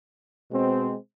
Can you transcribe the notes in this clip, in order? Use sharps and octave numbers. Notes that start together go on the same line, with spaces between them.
B2 G#3 C4